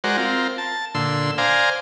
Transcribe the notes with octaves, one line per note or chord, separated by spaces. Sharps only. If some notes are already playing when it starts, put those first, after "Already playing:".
G#3 F#4 A#4 C5 D5
C4 F4 A#4
A5
A#2 D3 C6 E6
C5 D5 F5 G#5 A#5